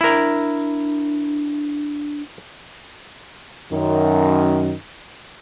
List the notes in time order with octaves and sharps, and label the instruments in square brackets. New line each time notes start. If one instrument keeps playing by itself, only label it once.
[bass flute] D4 [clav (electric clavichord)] E4 A#4
[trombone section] F#2 D#3